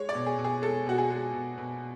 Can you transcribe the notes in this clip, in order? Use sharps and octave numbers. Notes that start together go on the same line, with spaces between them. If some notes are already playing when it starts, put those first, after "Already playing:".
Already playing: G#3 C#5
D5
B2
G#4
B2
G#4
G#3 A4
B2 F#4
G#4
G#3
B2
B2